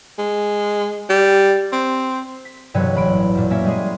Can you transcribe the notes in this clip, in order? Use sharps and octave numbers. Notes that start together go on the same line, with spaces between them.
G#3
G3
C4
B6
E1 G2 C3 F#3 B4 C#5
A1 B5 D7
F#2 A#2
A#3 C#4 E5
G3 G#3 G#4